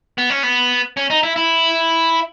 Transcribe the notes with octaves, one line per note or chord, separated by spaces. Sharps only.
B3
C#4
B3
C#4
D#4
E4
E4